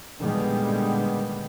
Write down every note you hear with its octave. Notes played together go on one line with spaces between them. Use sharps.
A#2 D3 D#3 G3 G#3 B3